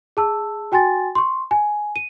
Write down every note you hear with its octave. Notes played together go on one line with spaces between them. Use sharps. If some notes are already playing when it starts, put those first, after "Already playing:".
G#4 A5 E6
F#4 G5 G#5 C6 A6
C6 C#6
G#5
D#7